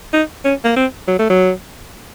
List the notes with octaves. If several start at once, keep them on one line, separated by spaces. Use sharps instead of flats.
D#4
C#4
A#3
C4
F#3
A3
F#3